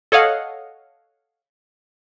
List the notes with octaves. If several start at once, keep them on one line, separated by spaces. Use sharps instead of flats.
A4 C#5 D#5 F5 F#5